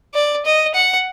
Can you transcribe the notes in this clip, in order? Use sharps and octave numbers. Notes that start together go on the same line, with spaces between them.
D5
D#5
F#5